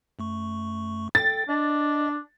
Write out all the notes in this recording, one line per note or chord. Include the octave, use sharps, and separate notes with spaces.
F#2 A3 C#6
A4 G5 A6
D4 D#5